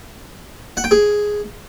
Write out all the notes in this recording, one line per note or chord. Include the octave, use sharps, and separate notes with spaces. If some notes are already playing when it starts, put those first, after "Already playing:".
F#5
G5
G#4